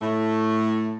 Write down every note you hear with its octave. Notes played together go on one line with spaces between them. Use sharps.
A2 A3